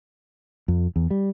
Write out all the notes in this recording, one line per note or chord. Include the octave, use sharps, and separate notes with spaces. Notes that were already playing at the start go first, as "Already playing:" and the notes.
F2
E2
G3